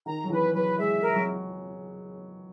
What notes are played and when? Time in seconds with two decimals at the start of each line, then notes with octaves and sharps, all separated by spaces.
0.06 D#3 A#5
0.24 F#3
0.30 E3 B4
0.54 F#3 B4
0.78 G#3 E5
1.02 A#4
1.15 F#3